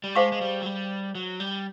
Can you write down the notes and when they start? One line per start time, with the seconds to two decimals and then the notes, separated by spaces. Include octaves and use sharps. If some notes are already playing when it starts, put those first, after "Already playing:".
0.04 G3
0.15 G#3 G#4 C5 F5 A5 C#6
0.32 G#3
0.41 G3
0.62 F#3
0.66 G3
1.15 F#3
1.40 G3